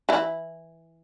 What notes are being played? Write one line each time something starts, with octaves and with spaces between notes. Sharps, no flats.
E3 E4